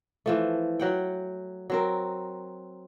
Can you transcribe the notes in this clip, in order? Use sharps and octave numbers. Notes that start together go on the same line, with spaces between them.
E3 F3 A3
F#3 F#5 G5
F#3 C4 A#4